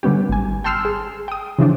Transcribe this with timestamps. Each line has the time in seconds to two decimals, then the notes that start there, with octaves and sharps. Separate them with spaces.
0.03 D3 G3 B3 C#4 G4
0.29 G#1 G#5
0.64 G5 A5 C6 E6 F6 C7
0.85 G#4
1.28 G5 D#6
1.59 C#3 E3 F3 D4